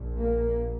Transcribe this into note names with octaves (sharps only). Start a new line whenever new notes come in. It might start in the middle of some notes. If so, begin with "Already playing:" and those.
Already playing: A#1 A#2
A#3